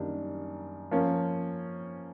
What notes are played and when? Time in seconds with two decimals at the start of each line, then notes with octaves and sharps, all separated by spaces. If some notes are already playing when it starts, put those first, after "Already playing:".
Already playing: F#2 D#3 G3 A#3 D4
0.91 F3 A#3 C#4